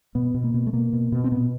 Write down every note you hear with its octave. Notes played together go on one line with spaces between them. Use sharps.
B2 B3
B2
A#3
B2
A3
B2 A#3
B2
B2
C4
A#2 B3